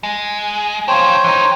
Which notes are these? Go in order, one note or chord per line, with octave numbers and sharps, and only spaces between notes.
G#3
D4 F4 C5 C#5 G5
E3 D#4